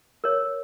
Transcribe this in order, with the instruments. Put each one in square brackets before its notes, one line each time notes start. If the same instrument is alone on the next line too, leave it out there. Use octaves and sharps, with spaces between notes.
[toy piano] A#4 C#5